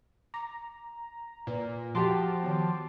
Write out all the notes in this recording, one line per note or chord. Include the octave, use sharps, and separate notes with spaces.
A#5 D6
A#2 B4
F3 F#4 G4 A5 C6 D6
D#3 B3